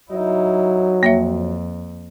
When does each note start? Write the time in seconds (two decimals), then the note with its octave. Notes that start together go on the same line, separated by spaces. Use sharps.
0.11 F#3 D#4 E4
1.03 F2 A#3 C#5 E5